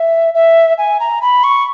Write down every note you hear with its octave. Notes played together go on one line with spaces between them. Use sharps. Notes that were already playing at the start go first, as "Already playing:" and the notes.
Already playing: E5
E5
G#5
A#5
B5
C#6